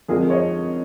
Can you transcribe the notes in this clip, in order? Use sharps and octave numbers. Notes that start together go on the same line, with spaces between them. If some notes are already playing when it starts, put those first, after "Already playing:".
F2 D3 F3 G#3 G#4 A#4
C#5 D#5